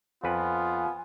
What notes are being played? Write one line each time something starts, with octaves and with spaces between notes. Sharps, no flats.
F2 B3 F4 B4 G#5